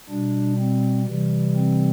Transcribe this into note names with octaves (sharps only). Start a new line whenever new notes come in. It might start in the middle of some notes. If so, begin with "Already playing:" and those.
B2 G3 D4
C4
C3 E3 G3
C4